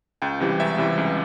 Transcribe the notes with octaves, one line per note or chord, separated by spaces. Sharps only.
C#2 G5
C3 E3 G3
C#2 E5
C3 E3 G3
C#2